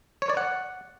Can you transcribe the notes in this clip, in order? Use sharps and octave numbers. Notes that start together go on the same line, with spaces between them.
C#5
D5
F#5